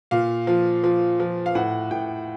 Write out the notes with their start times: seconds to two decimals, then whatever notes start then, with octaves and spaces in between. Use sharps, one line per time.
0.11 A#2 F5
0.47 F3
0.84 F3
1.20 F3
1.46 F5
1.55 A2 F#5
1.91 A2 G5